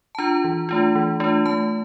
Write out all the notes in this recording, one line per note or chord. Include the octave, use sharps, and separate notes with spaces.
A5
D4 F4 A#5
E3
A3 D4 F4
E3
A3 D4 F4
A3 A5